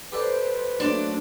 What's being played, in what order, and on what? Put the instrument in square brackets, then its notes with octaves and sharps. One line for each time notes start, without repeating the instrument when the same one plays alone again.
[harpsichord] G4 A4 D5 [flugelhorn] B4 [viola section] C5
[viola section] F#3 A3 A#3 [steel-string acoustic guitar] D4 [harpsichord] C5 D5 C6